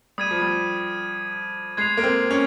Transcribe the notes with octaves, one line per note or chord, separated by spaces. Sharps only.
G3 D#6 G#6 D#7
F3
G3
G#3 G#6 C7 F7
A#3
C4
C#4